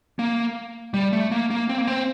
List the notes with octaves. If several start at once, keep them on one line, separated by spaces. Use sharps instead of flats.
A#3
G3
A3
A#3
A#3
C4
A#3
C4